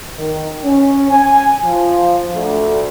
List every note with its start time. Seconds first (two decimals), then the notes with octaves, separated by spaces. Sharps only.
0.16 D#3
0.64 C#4
1.11 G#5
1.65 F3
2.35 D2